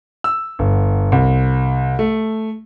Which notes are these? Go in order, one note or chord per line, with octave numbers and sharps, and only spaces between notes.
E6
G1
C2
A3